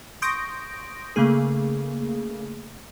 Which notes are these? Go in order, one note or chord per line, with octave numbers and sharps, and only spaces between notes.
C6 C#6 D#6 G6 A#6 D7
C#3 A3 A#3 G#4